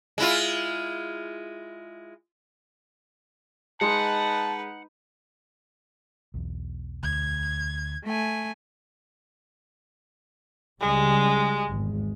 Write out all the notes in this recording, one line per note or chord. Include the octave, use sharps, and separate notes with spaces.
G#3 E4 F4
G#3 D#4 B4 F#5 A5 C6
B1 E2
D2 G#6
A3 G#5
C#2 C#3 G3 G#3
G#1 E2 G#3